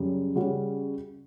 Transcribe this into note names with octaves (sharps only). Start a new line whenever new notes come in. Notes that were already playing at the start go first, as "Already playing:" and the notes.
Already playing: F#2 C#3 G3
C#3 G3 C#4 F#4